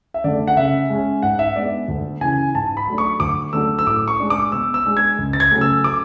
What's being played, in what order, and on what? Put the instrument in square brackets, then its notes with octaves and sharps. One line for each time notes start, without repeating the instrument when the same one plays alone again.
[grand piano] E5
D3 A3 D5
F#5
C#3 E5
G#3 C#4
G#2 F#5
E5
G#3 B3 D4 D5
D2
C#3 E3 G#5
G#2 A5
B5
F#3 A3 D4
C#6
D2 D6
D3 F#3 A3 D4 E6
E6
A2 D6
C#6
G#3 D4
D6
B2 E6
E6
G#3 D4
G#6
C#2
A6
G#6
C#3 F#3 A3 C#4
E6
D6